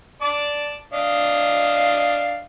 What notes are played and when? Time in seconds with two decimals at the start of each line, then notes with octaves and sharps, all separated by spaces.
0.22 D5 A5 D6
0.93 D4 D#5 F5